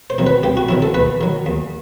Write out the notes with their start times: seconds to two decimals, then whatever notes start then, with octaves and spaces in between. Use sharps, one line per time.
0.10 C5
0.18 C3 D#3 F#3
0.26 B4
0.43 C2 G4
0.57 F#4
0.69 C3 D#3 F#3 E4
0.82 A4
0.94 D#2 B4
1.21 D#3 F#3
1.46 D#2